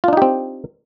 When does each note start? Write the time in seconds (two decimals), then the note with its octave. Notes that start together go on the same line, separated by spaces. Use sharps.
0.04 F4
0.08 D4
0.13 D#4
0.17 G4
0.22 C4